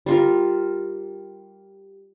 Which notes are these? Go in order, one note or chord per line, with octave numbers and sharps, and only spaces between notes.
G3 F4 A#4